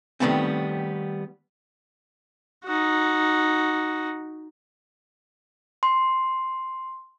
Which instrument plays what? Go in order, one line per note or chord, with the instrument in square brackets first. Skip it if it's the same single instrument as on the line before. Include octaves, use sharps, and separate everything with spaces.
[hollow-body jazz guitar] D#3 F3 G3 A3 B3 C4
[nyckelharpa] D#4 F#4
[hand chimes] C6